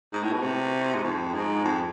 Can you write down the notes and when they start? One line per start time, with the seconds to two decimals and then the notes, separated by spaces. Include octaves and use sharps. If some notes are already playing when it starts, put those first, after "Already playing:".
0.13 G#2
0.23 A2
0.33 B2
0.42 C3
0.95 G#2
1.04 F2
1.34 G#2
1.64 F2